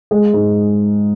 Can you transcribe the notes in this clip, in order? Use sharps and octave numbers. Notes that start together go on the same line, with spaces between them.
G#3
G#2